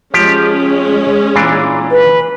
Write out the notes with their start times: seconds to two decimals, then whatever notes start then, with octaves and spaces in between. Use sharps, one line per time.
0.14 F3 G#3 C#4 G4
1.36 A#2 E3 D4
1.91 B4